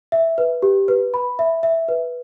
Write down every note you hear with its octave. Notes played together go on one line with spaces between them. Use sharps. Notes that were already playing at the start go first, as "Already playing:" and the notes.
E5
B4
G4
B4
B5
E5
E5
B4